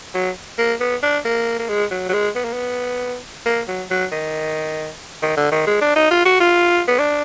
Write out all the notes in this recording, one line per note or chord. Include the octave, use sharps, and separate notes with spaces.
F#3
A#3
B3
D4
A#3
A#3
G#3
F#3
F#3
G#3
B3
A#3
B3
A#3
F#3
F#3
D#3
D#3
D3
D#3
G#3
D4
D#4
F4
F#4
F4
B3
D4